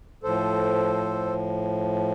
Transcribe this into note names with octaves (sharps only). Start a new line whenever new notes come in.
A2 F3 A4 C5